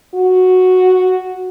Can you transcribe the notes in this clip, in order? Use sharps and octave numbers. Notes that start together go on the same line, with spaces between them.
F#4